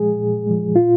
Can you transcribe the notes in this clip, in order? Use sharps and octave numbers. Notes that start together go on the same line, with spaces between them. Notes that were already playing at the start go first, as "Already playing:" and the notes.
Already playing: A#2 F3 G#3 G#4
A#2
F3 G#3
A#2 F4